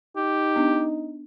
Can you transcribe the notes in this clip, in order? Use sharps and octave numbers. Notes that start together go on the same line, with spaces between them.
D#4 G4
B3 D4